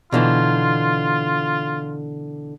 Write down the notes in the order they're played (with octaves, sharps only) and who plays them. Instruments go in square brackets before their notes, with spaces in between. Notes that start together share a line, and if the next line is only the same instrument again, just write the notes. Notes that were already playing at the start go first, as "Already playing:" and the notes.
[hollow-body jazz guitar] B2 D3 E3 [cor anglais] F4